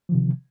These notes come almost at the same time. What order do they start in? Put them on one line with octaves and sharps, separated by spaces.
F3 D#3 C3